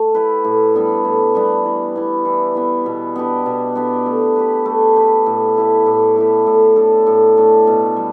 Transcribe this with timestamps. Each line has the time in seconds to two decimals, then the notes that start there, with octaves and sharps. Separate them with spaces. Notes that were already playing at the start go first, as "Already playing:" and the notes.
Already playing: A3
0.15 E4 G4 B4
0.44 A2
0.75 G3 B3 D4
1.05 A2
1.35 G3 B3 D4
1.65 E3
1.96 B3 E4
2.25 E3
2.55 B3 E4
2.86 B2
3.16 B3 D4 G4
3.46 B2
3.76 B3 D4 G4
4.06 A3
4.36 G4 B4
4.66 A3
4.96 G4 B4
5.26 A2
5.56 A3 E4 G4
5.86 A2
6.16 A3 E4 G4
6.47 A2
6.76 A3 D4 A4
7.07 A2
7.37 A3 D4 A4
7.67 B2
7.97 G3